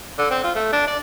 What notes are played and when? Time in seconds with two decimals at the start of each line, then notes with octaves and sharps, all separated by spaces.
0.18 D3
0.31 C4
0.43 F4
0.55 A3
0.72 D4
0.87 D5